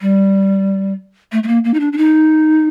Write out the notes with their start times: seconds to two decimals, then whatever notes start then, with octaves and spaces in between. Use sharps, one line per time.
0.01 G3
1.32 A3
1.43 A3
1.48 A#3
1.64 A#3
1.74 D#4
1.80 D4
1.93 D4
1.97 D#4